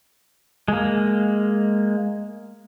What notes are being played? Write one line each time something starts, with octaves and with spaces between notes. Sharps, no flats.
G#3 A#3